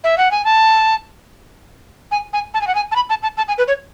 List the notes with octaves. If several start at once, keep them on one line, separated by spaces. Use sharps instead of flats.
E5
F#5
G#5
A5
G#5
G#5
A5
G#5
F#5
G#5
A5
B5
A5
A5
A5
G#5
B4
C#5